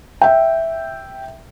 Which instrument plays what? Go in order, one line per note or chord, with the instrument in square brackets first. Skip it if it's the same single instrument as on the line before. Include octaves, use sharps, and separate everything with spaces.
[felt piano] E5 G5